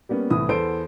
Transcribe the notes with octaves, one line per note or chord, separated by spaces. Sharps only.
G3 A#3 B3 C#4
C2 A2 E3 D#6
E2 B3 A4 C5 D7